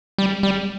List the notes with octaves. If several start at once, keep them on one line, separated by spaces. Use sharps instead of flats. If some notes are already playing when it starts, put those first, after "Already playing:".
G3
G3